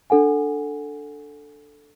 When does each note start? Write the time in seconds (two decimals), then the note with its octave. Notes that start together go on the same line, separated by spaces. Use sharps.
0.10 D4 A4 F#5 G#5